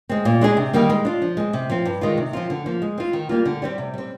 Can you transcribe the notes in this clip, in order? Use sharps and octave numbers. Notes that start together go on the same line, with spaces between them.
G#3 C4
A#2
G#3 D4 G#4
C3
D#3 G3 A#3
G#3
D4 F4
F3
G#3 C4
C3
F3 C4
G2
D#3 G#3 D4 F4
C3
F3 C4 F4
D3
F3 A#3
G#3
C4 F4
D#3
G3 A#3 F4
D3
G3 C4 G4 D5
C3
G3 C4